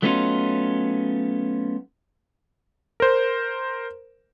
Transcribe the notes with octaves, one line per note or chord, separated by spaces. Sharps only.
F#3 A3 B3 C#4 D#4 F4
A#4 C5